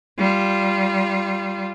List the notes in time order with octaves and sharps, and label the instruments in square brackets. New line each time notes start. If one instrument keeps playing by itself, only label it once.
[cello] G3 F4